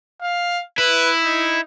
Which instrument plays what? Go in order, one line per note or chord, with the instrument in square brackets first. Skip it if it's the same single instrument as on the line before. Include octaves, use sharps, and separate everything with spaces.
[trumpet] F5
[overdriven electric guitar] E4 [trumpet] B4
[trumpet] D#4